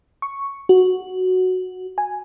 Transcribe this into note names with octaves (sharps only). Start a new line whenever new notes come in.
C#6
F#4
G#5